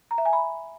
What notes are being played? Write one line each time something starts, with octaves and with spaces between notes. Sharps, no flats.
A#5
E5
G#5
B5